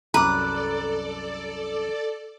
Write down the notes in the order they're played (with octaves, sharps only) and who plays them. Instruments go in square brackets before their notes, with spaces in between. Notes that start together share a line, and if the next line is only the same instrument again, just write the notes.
[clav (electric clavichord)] C2 F#2 [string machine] A4 D5 [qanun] B4 [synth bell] A#5 D6